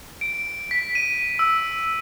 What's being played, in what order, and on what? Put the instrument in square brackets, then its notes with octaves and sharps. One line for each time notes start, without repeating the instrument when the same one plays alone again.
[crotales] D7
B6
D#7
E6